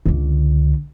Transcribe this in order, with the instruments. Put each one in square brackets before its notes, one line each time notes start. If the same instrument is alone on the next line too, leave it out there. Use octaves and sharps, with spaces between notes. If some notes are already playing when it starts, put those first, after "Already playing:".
[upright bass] C#2 D3